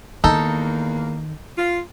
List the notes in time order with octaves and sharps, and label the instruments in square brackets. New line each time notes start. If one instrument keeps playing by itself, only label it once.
[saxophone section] E2 A#3 [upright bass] D#3 [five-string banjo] D#4 A4
[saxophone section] F4